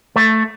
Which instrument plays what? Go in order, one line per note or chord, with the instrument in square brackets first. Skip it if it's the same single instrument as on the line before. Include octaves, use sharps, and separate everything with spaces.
[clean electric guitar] A3